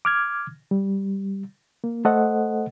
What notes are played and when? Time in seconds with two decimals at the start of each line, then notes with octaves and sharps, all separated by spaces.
0.05 D6 F6 G#6
0.71 G3
1.84 A#3
2.05 A3 A4 C5 D#5 F#5